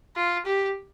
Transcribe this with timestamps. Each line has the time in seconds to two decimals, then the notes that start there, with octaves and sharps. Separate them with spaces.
0.16 F4
0.46 G4